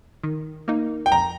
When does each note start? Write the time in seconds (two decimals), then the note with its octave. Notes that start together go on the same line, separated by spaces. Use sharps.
0.23 D#3
0.68 A#3 D#4
1.06 G5
1.12 F2 A#5